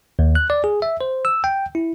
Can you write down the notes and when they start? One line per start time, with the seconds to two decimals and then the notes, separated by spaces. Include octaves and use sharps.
0.19 D#2
0.35 F#6
0.50 D5
0.64 G#4
0.82 E5
1.01 C5
1.25 E6
1.44 G5
1.75 E4